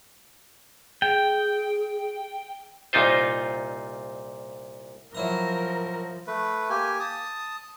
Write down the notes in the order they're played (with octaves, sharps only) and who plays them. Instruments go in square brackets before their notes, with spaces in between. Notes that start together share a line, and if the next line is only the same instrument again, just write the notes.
[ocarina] G#4 [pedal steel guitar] G5
[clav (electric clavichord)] C2 A#2 D#4 F4 C5
[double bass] F3 [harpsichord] F#3 E4 A#5 [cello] A#4
[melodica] A3 B4
A#3 G4 G#5
A5 D#6